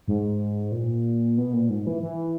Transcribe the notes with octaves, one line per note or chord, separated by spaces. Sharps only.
G#2
A#2
B2
A#2
G#2
E3
E3